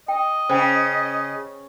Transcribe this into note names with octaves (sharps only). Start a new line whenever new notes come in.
D#5 G5
C#3 C5 G5